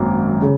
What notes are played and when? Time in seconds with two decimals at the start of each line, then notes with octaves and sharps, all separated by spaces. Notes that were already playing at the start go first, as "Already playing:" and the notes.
Already playing: G#1 F#2 A#3
0.42 C#3